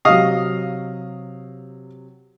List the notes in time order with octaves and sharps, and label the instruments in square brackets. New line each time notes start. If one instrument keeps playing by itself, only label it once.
[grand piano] C3 F#3 [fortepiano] D#5 F5 D#6